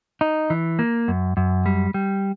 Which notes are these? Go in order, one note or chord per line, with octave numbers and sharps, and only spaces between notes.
D#4
E3
A#3
F#2
F#2
G3
G3